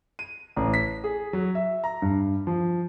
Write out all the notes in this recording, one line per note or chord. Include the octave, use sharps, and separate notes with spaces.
D#7
A1
B6
G#4
F#3
E5
A#5
G2
F3